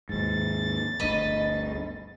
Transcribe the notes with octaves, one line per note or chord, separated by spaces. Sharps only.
D#2 G#2 A6
G1 D2 D3 D#5 B5